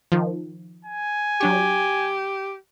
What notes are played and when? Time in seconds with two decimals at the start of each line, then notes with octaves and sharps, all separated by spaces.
0.12 D#3 F3
0.85 G#5
1.41 F#3 D4 G4 C#6